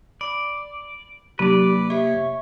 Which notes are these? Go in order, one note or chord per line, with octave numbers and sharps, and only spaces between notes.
D5 B5
C3 F#3 A#3 D4 G4 B4 D5
G4 C#5 D#5 E5